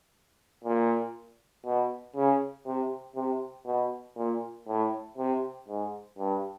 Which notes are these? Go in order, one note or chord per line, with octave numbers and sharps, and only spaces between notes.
A#2
B2
C#3
C3
C3
B2
A#2
A2
C3
G#2
G2